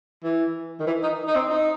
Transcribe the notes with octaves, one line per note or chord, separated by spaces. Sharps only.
E3
D#3
E3
D#4
D#4
C4
D#4